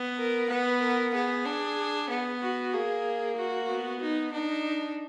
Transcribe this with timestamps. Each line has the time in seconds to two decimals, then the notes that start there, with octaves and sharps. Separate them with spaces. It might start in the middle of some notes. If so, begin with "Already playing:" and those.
Already playing: B3
0.18 A#4
0.49 B3 B4
0.82 A#4
1.14 B3 G#4
1.45 D4
2.10 B3
2.42 F#4
2.73 A#3 G#4
3.37 F#4
3.68 B3
4.01 D#4
4.33 D4 D#4